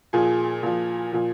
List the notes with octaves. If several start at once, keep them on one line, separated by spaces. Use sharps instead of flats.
A#2 F3 G#4
A#2 F3
A#2 F3